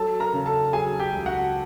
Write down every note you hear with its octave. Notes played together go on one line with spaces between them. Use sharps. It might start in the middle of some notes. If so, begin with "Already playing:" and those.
Already playing: F#3 A4 A5
A#4 A#5
C#3
A4 A5
F#3 G#4 G#5
G4 G5
C#2
F#4 F#5